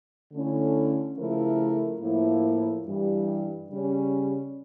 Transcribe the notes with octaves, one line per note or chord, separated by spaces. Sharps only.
D3 A3 C#4 E4
C#3 F3 A3 E4 A#4
A2 F3 A#3 E4
G2 E3 G3
C#3 G3 C#4